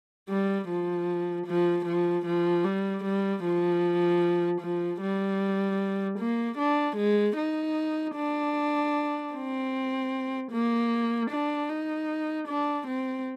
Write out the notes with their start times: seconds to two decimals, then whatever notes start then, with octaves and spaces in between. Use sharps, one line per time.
0.29 G3
0.68 F3
1.46 F3
1.86 F3
2.26 F3
2.64 G3
3.04 G3
3.44 F3
4.61 F3
5.01 G3
6.18 A#3
6.58 D4
6.97 G#3
7.36 D#4
8.15 D4
9.34 C4
10.52 A#3
11.30 D4
11.69 D#4
12.48 D4
12.87 C4